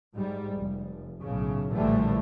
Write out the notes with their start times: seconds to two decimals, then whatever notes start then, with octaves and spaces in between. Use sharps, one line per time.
0.14 G#2 G3
0.57 F1
1.20 B1 A2 C#3
1.72 A#1 A2 D3 E3 G3 A3